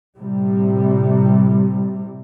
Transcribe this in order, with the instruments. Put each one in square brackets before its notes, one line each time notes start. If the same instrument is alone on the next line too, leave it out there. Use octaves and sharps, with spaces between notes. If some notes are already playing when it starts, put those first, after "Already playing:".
[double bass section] A2 C3 G3